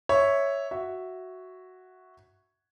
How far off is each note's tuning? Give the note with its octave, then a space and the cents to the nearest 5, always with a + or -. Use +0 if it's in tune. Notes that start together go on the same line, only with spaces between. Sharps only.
C#5 +0 E5 -5
F#4 +0 E5 +0